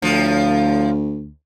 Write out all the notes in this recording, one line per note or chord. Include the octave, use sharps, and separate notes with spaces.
D2 A2 F3